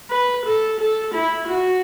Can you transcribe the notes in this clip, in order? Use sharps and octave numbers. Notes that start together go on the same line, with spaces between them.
B4
A4
A4
E4
F#4